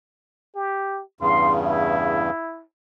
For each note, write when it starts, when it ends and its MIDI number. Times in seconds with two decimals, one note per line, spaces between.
0.56 1.02 67
1.21 2.30 40
1.21 2.30 43
1.21 2.30 49
1.21 1.55 84
1.62 2.63 64